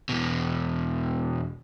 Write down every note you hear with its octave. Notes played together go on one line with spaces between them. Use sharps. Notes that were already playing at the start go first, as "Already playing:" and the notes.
E2 B2